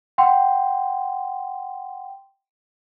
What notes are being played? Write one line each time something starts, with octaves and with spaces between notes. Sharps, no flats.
F#5 G5 C6